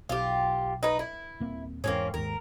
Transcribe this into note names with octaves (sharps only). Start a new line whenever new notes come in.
B1 F4 G4
D#4 B4
E4
D#1 A#3 C4
E2 G#2 A#3 C4 C#4
D#2 G#2 A#4